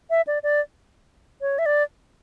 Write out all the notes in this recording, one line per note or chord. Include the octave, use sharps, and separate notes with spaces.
E5
D5
D5
C#5
E5
D5